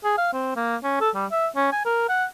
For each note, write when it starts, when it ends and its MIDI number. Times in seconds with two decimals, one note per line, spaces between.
0.04 0.13 68
0.18 0.28 77
0.33 0.54 60
0.56 0.76 58
0.84 0.98 61
1.00 1.10 69
1.15 1.26 55
1.32 1.47 76
1.56 1.68 61
1.73 1.83 80
1.85 2.07 70
2.09 2.25 78